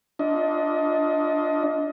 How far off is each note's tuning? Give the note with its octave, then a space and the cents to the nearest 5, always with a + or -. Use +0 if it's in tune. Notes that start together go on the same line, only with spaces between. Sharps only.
D4 +0 F4 +0 D#5 +25